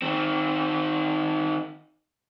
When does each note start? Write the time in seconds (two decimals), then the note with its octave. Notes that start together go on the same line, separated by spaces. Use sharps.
0.02 D#3 C4